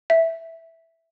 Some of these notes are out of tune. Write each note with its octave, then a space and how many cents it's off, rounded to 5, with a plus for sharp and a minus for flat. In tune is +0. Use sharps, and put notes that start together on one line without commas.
E5 -5